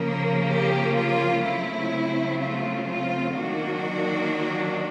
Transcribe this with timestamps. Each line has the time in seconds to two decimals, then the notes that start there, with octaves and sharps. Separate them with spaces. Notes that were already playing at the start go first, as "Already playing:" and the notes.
Already playing: C#3 F3 A#3
0.46 G4
0.94 F4
1.43 C#3 F#3 A3 C4 E4
2.40 F4
2.87 F4
3.36 D#3 F#3 A#3 D4 F#4